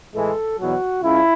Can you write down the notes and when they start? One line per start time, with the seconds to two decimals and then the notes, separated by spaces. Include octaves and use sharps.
0.14 A2 E3 G#3 A4
0.58 E2 B2 F#3 F#4
1.02 C#2 C#3 E4